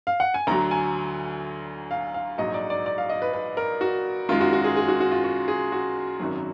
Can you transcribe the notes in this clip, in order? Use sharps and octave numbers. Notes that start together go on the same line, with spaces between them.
F5
F#5
G#5
D2 D3 F#3 A#5
G#5
F5
F5
A#1 G#2 F#3 D#5
D5
D5
D5
F5
D#5
B4
B4
A#4
F#4
F#2 D#3 G#3 F4
F#4
F#4
G#4
G#4
F#4
F#4
F4
F#4
G#4
F#4
G#1 F#2 D#3 F#3